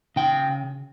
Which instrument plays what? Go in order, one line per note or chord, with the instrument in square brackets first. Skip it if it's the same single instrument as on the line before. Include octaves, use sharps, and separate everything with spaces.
[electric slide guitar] C#3 G5